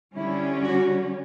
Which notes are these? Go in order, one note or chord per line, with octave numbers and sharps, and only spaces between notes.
D3 G3 C#4 E4
F#4